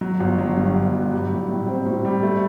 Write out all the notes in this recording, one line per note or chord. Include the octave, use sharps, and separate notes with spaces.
F#3
G1
F#3
G2
G1
F#3
G3
A2
A2
C4
A2
G3
A3